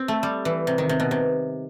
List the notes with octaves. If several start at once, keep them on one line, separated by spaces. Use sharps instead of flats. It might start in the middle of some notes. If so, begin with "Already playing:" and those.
Already playing: C4
A3
G3
E3
C3
D#3
C3
B2
C3